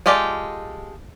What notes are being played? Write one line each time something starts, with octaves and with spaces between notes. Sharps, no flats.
G#3 F4 G4 A4 D5